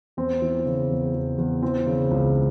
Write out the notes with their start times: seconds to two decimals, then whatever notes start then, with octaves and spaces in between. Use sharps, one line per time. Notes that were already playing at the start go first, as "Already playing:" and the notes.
0.17 E2 C4
0.42 E3
0.66 C#3
0.90 E2
1.15 E2
1.38 E2
1.62 E3 C4
1.87 C#3
2.11 C#2